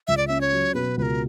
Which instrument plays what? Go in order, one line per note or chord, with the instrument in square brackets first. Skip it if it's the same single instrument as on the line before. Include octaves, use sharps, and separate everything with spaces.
[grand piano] C#2 [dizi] E5
[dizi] D5
[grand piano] C#4 [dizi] E5
[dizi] C#5
[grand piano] F#3
[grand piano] B2 [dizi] B4
[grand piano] C#2 [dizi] B4
[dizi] A#4